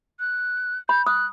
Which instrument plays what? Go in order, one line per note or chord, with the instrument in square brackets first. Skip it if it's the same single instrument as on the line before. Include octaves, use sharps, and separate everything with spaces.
[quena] F#6
[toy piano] B5 [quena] G6
[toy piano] D#6 [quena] F#6